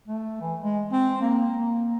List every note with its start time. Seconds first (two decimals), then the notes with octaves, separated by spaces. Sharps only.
0.08 A3
0.41 E3
0.60 G#3
0.92 C4
1.21 A#3
1.57 A#3